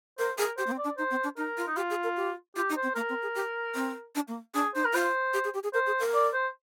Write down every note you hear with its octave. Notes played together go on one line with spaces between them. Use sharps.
A#4 C5
G#4 A#4
G4 C5
A#3
C4
D5
D4
D#4 C5
C4
D4
D#4 A#4
F4
D#4
F4 G4
G#4
A#4
G4
F4 G4
D#4
C5
C4
A#3 A#4
C4
G#4
G4
C4
D4
A#3
D4 G#4
D#4 C5
A#4
F4 C5
G4
G#4
G4
G#4
A#4 C5
G#4
A#4
D5
C5